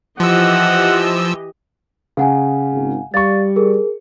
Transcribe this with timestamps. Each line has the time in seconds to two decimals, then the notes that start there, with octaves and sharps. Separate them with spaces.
0.20 E3 F3 G4 D#5 F#5 E6
2.17 C#3 F5 F#5 G#5
2.72 G#1
3.14 G3 D5 F5 C#6 A6
3.56 G#4 A#4